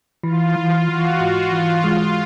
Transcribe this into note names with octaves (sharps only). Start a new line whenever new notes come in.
E3 F4
E3 F4
E3 F#4
G#2
E3 F4
G#3